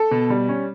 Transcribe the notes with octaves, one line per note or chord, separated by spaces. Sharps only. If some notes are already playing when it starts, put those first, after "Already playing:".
Already playing: A4
B2
G3
C#4